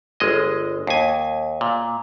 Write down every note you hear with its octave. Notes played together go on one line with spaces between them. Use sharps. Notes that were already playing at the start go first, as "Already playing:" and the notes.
G1 G#3 D#5
D#2 G#5
A#2